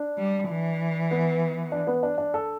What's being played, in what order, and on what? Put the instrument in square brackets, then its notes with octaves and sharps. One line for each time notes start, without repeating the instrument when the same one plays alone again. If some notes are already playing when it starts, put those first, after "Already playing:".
Already playing: [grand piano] D4
[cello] G3
E3
[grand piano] B3
D4
B3
D4
D4
A4